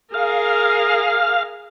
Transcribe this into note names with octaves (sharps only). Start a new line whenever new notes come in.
G#4 A#4 F5